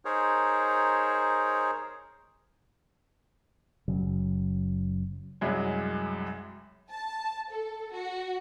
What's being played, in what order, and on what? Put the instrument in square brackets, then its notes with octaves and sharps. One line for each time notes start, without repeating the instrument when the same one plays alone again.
[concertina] D#4 G#4 A#4 C5 C#5
[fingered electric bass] F#1 C#3 F#3
[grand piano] C2 F#2 F#3 G#3
[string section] A5
A4
F#4